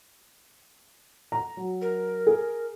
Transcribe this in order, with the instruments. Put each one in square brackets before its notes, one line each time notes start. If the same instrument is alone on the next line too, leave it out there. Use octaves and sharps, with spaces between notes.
[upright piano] A#5
F#3
[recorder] A#4
[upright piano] G#4